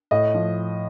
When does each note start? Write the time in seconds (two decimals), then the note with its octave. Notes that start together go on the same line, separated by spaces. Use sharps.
0.11 A2 D#5
0.34 F3